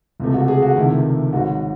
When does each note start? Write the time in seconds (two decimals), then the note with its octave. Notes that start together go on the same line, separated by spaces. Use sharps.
0.20 C#2 C3 E3 A3
0.34 F#4
0.48 G#4
0.62 F#4
0.76 C#2 C3 D#3 A3 E4
1.33 G#1 G#2 F#3 F#4